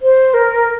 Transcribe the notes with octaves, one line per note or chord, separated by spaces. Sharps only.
C5
A#4